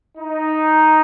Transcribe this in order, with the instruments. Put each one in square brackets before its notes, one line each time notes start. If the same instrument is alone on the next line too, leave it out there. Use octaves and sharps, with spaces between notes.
[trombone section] D#4